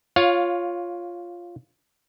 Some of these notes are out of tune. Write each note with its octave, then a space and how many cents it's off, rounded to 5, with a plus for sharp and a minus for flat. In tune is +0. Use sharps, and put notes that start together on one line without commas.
F4 +0 C#5 +0 F5 +20